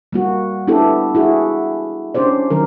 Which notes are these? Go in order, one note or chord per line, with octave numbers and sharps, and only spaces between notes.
G3 A#3 F#4
B3 D4 E4 G4 A4
E4 F#4 G#4
C#4 D4 G4 C5 D5
D#3 F#3 A#4